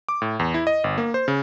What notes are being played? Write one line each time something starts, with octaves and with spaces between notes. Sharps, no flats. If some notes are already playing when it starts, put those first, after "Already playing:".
D6
A2
E2
E4
D#5
G1
A#3
C5
C#3